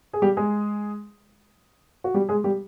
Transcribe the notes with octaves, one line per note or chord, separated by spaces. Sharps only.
G#4
G3 G4
G#3 G#4
F#4
G3 G4
G#3 G#4
G3 G4